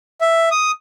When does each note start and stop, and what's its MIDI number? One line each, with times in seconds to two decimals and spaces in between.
0.21 0.49 76
0.51 0.71 87